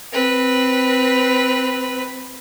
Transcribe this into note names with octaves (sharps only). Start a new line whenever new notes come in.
C4 B4